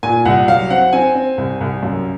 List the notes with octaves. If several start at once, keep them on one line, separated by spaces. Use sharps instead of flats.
A#2 G#5
C2 F#5
F#3 F5
C4 F#5
C4 G#5
C4
C2
C2
F#2